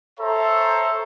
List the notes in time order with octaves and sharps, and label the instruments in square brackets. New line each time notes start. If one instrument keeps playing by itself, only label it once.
[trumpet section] A4 C5 C#5 E5 A#5